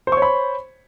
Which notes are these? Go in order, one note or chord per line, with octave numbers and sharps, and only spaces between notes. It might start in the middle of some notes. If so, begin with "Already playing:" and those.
C5 C#5 B5 C#6